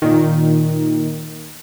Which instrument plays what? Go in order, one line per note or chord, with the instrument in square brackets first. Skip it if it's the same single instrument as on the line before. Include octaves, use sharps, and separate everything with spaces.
[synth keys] A#2 D#3